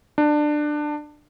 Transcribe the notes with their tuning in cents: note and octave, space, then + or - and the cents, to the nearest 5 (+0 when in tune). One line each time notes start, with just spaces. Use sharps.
D4 +20